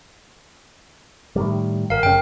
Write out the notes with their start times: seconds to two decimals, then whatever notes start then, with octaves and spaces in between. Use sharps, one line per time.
1.36 A2 D#3 G3
1.90 G#1 A#4 F5
2.03 F#1 C#3 G5